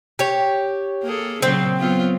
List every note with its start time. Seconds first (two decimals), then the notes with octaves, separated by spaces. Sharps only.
0.19 G4 C#5
1.03 A#3 G#4 A4
1.42 A#2 C#3 F#3 C4
1.78 F#3 B3 F4